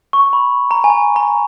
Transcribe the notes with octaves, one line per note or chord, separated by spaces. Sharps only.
C#6
B5
A#5
G#5
A#5
A#5